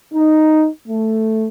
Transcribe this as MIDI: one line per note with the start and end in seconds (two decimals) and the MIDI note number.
0.13 0.68 63
0.88 1.48 57